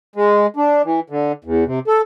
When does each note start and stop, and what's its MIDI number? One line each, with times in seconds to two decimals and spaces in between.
0.16 0.46 56
0.56 0.82 62
0.84 1.00 52
1.10 1.32 50
1.44 1.64 40
1.66 1.79 48
1.87 2.01 69